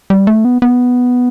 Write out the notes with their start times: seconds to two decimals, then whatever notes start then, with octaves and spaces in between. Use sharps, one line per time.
0.10 G3
0.27 A3
0.45 B3
0.62 B3